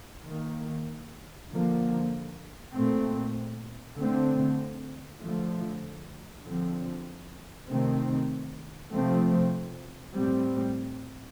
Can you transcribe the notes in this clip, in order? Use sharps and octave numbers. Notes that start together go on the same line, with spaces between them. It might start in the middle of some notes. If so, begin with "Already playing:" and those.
D#3 A#3
D3 F3 A#3
A#2 A3 C4
D3 A3 C4
D3 F3 A3
D3 F3 C4
C3 D#3 A3 C4
C3 F3 A3 C4
A2 G3 C4